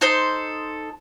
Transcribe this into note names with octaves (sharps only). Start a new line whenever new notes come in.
D#4 A4 C5